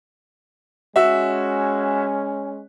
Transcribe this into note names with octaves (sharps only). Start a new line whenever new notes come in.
G#3 C#4 F#4 E5